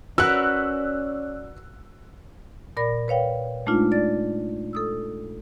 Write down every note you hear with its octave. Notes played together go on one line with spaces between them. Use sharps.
C#4 F#4 A#4 B4 D5 E6 F#6
A#2 A#4 D5 B5 A#6
B4 C#5 F5 G5
G#3 A3 D4 D#4 F4
D5 A6
A4 D#6 E6